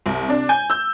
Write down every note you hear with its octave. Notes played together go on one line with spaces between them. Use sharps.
C2
C3 D4
G#5 G6
E6 G6